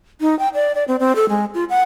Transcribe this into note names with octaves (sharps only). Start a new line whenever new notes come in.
D#4
G5
D5
D5
C4
C4
A4
G#3
F4
F#5